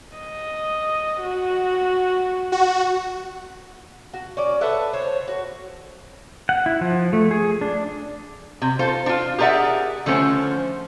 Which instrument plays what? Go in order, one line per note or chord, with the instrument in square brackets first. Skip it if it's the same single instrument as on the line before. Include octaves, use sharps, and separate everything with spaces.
[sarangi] D#5
F#4
[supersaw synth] F#4
[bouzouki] F#4
C#4 D5
A4 B4 E5 F#5
C5 C#5
F#4
[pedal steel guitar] F#5
E4
F3
A3
G#4
D4
[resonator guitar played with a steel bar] C3
F4 A4 C5
D4 F4
G4 G#4 A#4 D5 E5 F#5
D3 F3 A3 C#4 C5